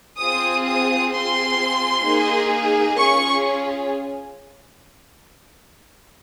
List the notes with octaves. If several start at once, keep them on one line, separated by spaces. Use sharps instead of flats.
C4 F4 G#4 D#6
D#6
C4 F4 G#4 C6
A#3 D#4 G#4
C#4 F4 G#4 C#6